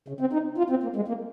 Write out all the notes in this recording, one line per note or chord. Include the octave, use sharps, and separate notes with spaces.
C#3
C4
D#4
F4
C4
A#3
G#3
A#3